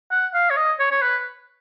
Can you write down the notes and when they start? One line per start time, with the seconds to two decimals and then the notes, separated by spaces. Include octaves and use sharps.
0.11 F#5
0.34 F5
0.50 C#5
0.56 D#5
0.79 C#5
0.91 C#5
1.01 B4